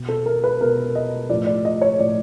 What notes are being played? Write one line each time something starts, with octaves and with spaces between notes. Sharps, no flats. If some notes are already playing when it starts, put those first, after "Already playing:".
Already playing: B2
A4
A#4
B4
B2 A#4
D#5
A2 F3 D5
D5
D#5
C#5
A2 F3 D5